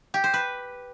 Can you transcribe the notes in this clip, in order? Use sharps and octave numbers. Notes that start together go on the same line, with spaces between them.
G4
C5
B4